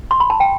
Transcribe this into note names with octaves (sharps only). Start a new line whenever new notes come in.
C6
B5
A5
G5